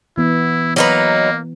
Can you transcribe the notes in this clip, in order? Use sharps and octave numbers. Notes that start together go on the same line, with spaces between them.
E3 B3 E4
F#3 A#3 D#4 B4